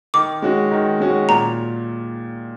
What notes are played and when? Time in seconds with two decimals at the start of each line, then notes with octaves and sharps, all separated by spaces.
0.14 D#3 D6
0.42 G#3 C#4 F#4
0.71 D#3
1.00 G#3 C#4 F#4
1.29 A#2 A#5